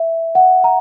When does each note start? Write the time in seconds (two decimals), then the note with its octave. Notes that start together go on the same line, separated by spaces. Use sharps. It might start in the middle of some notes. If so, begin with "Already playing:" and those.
Already playing: E5
0.35 F#5
0.64 A#5